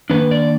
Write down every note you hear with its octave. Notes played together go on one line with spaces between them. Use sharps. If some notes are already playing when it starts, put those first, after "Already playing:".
D#3 A#3 D4 B4
D5